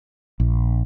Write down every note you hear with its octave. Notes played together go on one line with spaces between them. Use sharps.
A#1